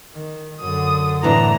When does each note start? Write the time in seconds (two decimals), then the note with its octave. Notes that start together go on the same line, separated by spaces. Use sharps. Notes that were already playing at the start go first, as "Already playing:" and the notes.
0.15 D#3
0.61 F#2 D3 D#6
1.23 D#2 A2 E3 B3 D4 A#5